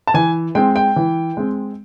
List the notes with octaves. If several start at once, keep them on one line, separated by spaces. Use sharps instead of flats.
A5
E3 G#5
G#3 C4 G5
G5
E3
G#3 C4